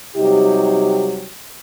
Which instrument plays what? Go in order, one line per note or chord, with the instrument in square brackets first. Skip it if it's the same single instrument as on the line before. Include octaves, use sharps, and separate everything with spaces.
[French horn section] C3 F#3 G3 D#4 G4